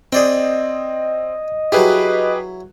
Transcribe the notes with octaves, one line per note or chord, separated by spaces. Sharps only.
C4 G#4 D5 D#5 G5
F#3 E4 G4 G#4 B4